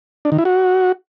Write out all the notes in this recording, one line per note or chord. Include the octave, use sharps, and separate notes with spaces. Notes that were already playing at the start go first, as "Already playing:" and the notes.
D4
D#3
E4
F#4